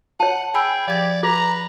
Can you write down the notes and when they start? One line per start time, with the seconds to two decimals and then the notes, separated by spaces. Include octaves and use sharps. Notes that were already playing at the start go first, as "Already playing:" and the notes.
0.20 C#5 F#5 A5
0.54 G#4 G5 G#5 B5 E6
0.88 F3 G4 D5 G#6
1.23 G#4 B4 A#5